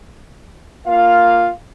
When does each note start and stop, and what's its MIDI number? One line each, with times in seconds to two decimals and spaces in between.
0.86 1.49 58
0.86 1.49 65
0.86 1.49 77